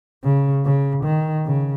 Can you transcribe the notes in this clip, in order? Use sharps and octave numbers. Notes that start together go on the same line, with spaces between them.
C#3
C#3
D#3
C#3